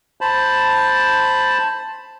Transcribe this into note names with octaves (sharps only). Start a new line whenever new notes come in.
C5 A5 B5